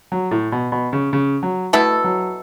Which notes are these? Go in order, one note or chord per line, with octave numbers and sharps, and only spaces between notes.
F#3
A2
B2
B2
C#3
C#3
F#3
B2 A3 B3 E4 A4
F#3